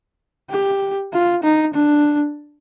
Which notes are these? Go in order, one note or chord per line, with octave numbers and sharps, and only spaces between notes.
G4
F4
D#4
D4